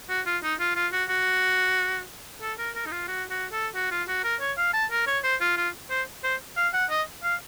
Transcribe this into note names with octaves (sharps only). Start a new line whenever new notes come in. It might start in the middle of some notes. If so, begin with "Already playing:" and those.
F#4
F4
D#4
F4
F4
F#4
F#4
A4
A#4
A#4
D#4
F4
F#4
F#4
A4
F#4
F4
F#4
A#4
C#5
F5
A5
A#4
C#5
C5
F4
F4
C5
C5
F5
F#5
D#5
F5